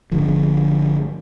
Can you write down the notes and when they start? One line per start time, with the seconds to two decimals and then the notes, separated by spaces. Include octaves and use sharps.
0.12 G1 D3 F3